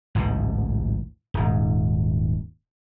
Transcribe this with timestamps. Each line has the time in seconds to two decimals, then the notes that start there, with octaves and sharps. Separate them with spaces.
0.15 A1 D2 G#2 B2
1.34 D#1 G#2